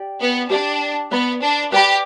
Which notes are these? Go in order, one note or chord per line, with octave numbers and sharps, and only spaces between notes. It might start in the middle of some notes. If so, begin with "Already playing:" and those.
Already playing: G4 D5 G5
B3
D4 G4 D5 G5
B3 B4 D5 B5
D4
G4 B4 D5 B5